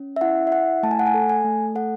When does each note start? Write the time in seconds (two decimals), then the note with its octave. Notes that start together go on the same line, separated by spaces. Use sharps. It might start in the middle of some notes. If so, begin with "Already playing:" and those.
Already playing: C#4
0.16 E5
0.21 E4 F#5
0.47 E5
0.52 E4 F#5
0.83 A3 A5
0.91 G#5
0.99 F#5
1.07 G#5
1.14 A4
1.29 G#5
1.45 A3
1.75 A4 F#5